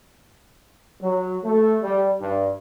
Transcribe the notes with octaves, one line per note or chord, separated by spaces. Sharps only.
F#3
A3
G3
G2